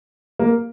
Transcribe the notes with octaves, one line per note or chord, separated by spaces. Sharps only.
A#3